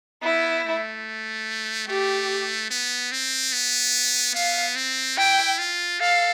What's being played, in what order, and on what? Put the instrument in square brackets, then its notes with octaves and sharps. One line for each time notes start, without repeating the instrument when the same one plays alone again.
[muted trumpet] B3 [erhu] E4
[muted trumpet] A3
[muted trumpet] A3 [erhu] G4
[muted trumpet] B3
C4
B3
[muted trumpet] B3 [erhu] F5
[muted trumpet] C4
[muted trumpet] E4 [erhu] G5
[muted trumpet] F4
[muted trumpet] A4 [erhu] F5